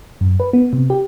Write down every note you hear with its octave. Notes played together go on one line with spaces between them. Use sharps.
F#2
B4
B3
C3
G4